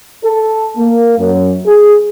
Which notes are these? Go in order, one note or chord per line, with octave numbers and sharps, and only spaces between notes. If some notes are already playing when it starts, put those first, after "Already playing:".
A4
A#3
F#2
G#4